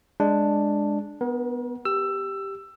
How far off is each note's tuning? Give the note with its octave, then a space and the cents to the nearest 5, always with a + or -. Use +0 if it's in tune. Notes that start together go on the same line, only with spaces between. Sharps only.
G#3 -5 D4 +0
B3 +0 A#4 +45
G4 +0 E6 +20